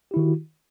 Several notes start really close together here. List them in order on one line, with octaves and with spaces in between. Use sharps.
G4 E4 D#3 F#4